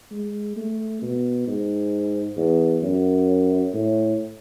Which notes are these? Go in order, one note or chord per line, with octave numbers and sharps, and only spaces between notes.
G#3
A3
B2
G#2
E2
F#2
A2